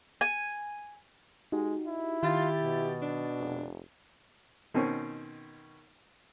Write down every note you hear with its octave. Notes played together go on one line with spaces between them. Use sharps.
G#5
G#3 D#4 F#4 G4
E4
D#3 F4 G4 A6
B2
D4
F1
B2 D#3 C4 C#4